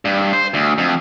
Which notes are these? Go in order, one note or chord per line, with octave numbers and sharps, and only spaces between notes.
G2
C5
D2
F2